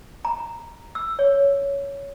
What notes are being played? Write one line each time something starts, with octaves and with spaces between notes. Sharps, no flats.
A#5
E6
C#5